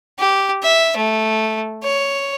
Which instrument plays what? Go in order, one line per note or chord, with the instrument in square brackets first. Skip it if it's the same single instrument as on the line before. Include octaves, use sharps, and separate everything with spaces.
[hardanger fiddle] G4
E5
A3
C#5